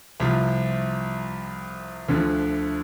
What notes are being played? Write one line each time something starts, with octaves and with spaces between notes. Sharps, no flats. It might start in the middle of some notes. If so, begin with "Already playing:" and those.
C2 C3 F3
D2 D3 F3